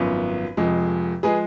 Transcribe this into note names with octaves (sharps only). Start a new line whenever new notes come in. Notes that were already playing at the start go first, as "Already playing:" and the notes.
Already playing: G#1 F#2 F3 B3 B4
F1 F2 F3 G#3
F3 G#3 G#4 B4